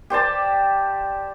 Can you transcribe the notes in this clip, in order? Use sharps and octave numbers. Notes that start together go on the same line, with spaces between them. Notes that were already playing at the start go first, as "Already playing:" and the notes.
G4 C5 D5 A5